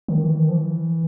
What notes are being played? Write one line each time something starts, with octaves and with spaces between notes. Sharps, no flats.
D#3
E3
D#3
F3
E3